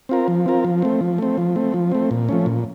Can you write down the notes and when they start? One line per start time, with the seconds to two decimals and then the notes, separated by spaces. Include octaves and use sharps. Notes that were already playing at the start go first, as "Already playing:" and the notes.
0.09 C4 F4 A#4
0.28 F3
0.46 C4 F4 A#4
0.64 F3
0.82 A3 C4
1.01 F3
1.18 A3 C4
1.38 F3
1.56 A3 C4
1.74 F3
1.92 A3 C4
2.11 A#2
2.29 F3 A3 C#4
2.46 A#2